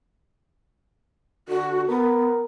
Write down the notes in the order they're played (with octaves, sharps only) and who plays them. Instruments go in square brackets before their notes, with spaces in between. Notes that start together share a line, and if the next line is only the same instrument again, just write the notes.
[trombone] D3 [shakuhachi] F#4
[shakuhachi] B3 [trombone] A#4